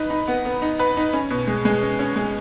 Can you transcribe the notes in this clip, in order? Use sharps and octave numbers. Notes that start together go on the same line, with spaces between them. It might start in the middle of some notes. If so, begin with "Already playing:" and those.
Already playing: D#4 B4
D#4
B3
B3
D#4
B4
D#4
C#4
B2
G#3
G#3
C#4
C#4
G#3